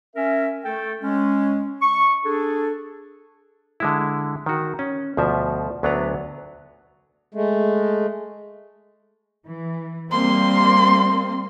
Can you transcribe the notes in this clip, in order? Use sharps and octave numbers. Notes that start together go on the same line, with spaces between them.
C#4 A#4 E5
A3 A4 G5
G#3 C#4
C#6
D4 G#4 A4
D3 G#3 E4
D#3 F#4
C#4
D2 B2 F3 E5
D2 F#3 B3 D4 B4 A#5
G#3 A3
E3
G3 A#3 C4 C6